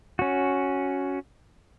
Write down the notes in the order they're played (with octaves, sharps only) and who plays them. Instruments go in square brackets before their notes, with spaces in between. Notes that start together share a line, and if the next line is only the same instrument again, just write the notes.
[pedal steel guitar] C#4 F#4